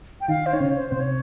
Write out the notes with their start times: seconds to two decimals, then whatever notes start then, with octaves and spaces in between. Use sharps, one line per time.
0.21 G5
0.28 D#3 D#4 F5
0.46 C5
0.53 D#4 C#5
0.60 C#3 C#4
0.76 C5
0.89 C3 C4 C5
1.00 C#5